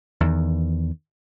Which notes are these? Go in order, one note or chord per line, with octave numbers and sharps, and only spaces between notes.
E2 D#3